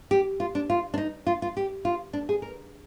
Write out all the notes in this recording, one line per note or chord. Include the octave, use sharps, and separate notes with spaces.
G4
F4
D4
F4
D4
D#4
F4
F4
G4
F4
D4
G#4
A#4